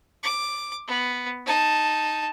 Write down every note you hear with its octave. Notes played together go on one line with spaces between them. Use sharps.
D6
B3
D#4 A5